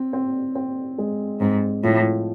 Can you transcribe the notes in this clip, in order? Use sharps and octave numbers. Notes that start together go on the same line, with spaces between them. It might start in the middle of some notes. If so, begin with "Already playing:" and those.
Already playing: C4
C4
C4
G#3
G#2 C4
A2 F3